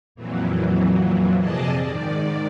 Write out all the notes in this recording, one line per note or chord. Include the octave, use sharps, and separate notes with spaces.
F2 A#2 E3 F#3
F2 C3 G#4 D5 D#5 A5
G#2 D#3 D5